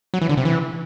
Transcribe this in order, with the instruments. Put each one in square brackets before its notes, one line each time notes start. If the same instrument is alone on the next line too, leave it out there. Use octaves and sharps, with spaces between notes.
[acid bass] F#3
E3
D3
C3
E3